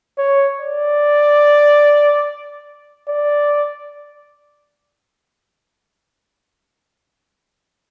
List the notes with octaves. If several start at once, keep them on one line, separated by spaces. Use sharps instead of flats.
C#5
D5
D5